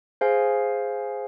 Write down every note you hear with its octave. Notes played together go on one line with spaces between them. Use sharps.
G#4 C5 F5 G#5